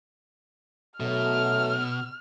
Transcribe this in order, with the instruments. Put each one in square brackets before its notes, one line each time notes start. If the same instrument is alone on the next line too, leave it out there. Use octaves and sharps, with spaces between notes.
[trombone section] B1 F#3 A3 [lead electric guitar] B2 [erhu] F6